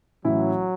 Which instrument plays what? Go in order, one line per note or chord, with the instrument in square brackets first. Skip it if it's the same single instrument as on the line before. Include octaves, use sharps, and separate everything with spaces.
[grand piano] A2 E3 C#4 E4 [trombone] F#3